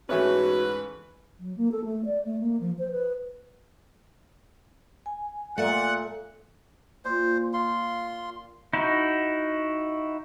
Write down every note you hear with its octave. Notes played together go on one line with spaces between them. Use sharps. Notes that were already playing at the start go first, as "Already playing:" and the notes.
G#2 E3 A3 C#4 F#4 B4
F#3
A#3
A4
A3
D5
A3
A#3
F3
C5
B4
G#5
A#2 A3 F#5
A#2 C5
F4 C6
D#4 E4 F#4